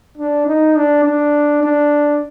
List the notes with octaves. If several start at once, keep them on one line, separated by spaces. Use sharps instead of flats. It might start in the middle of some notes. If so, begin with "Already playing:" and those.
D4
D#4
D4
D4
D4